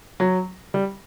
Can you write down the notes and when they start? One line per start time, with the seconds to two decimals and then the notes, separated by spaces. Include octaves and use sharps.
0.20 F#3
0.74 G3